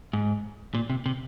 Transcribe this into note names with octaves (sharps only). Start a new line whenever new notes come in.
G#2
A#2
C3
C3